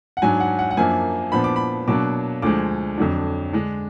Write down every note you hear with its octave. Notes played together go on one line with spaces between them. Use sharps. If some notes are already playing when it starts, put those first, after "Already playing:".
F#5
G#2 F#3 D4 G#5
F#5
F#5
F#5
F#2 F3 A#3 D4 G#5
A#2 F3 B3 D4 B5
D6
B5
B2 F#3 A#3 D4 D6
D2 D3 F3 G#3 D6
F2 D3 F#3 D4
D3 G#3 D4